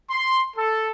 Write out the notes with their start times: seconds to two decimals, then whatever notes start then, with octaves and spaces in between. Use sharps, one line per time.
0.11 C6
0.57 A4